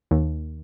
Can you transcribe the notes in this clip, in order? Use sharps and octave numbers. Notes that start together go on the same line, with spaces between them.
D#2